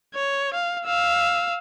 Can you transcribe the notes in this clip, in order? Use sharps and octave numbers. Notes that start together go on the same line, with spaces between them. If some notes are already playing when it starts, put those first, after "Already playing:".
C#5
F5
F5 E6